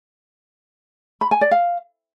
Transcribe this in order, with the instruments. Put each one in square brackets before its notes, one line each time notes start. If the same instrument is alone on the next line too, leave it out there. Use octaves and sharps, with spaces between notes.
[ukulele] B5
G#5
D5
F5